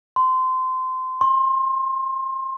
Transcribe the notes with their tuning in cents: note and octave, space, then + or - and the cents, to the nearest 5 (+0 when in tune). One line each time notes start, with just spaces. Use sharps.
C6 -20
C6 +30